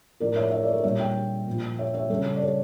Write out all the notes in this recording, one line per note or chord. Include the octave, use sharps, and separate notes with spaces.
A2 F3 A#4 D5
C#5 E5
C#5 E5
A#4 D5
A4 C#5
A#2 G3 C#5 E5
E5 G5
A#2 F3
C#5 E5
C#5 E5
C#3 G3 A4 C#5
D5
A4 C#5